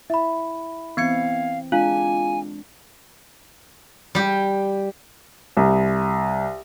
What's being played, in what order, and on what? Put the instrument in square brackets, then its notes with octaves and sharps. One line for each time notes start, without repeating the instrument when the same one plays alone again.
[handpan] E4 [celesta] E5 B5
[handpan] E3 C4 [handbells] B3 G#6 C#7 [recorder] F5
[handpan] G#3 D4 [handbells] F4 [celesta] F5 [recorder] G#5
[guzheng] G3 G4
[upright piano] C2